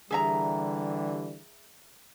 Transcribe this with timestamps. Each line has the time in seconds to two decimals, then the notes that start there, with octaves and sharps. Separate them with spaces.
0.11 D3 E3 G3 G#4 E5 A#5